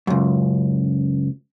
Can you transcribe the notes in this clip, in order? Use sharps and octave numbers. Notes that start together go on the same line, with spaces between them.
C#2 F#2